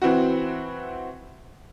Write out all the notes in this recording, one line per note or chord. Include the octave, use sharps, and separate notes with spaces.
E3 C4 E4 F#4